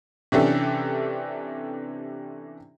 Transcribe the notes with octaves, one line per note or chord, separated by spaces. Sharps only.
C3 E3 C#4 D4 G4 A4